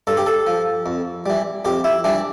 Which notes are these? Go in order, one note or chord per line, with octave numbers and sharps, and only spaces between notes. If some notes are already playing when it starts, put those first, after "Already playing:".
G2 A4
G4
A4
F3
F2
E3 G3
F2 G4
E4
E3 G3 D4